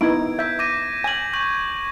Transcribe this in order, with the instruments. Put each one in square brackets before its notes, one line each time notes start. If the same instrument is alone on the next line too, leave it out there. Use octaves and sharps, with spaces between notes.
[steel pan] B3 D#4 E4 [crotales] G#6 D7
[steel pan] E5 [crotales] G6 B6
[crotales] D6 A#6 D#7
[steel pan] G#5 [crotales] G#6 F#7
[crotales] C#6 G6 F#7